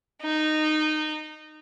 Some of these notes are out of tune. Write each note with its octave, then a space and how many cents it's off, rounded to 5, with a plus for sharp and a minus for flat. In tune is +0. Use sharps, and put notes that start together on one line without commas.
D#4 -15